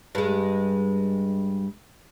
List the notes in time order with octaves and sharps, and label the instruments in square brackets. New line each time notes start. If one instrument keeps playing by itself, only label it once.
[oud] G2 G#3